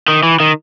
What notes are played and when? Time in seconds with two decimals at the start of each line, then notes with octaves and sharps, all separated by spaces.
0.08 D#3
0.23 E3
0.40 D#3